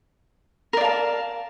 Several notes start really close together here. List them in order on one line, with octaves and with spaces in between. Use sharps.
A#4 D5 F5 A5